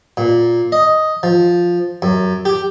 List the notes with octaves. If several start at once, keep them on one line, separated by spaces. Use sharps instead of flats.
A#2
D#5
F3
F#2
G4